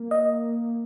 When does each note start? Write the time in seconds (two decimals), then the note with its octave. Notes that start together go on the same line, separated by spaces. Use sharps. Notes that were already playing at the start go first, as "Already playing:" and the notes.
Already playing: A#3
0.11 D#5